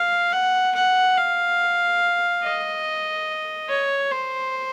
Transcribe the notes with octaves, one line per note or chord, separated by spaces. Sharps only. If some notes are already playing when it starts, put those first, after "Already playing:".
Already playing: F5
F#5
F#5
F5
D#5
C#5
C5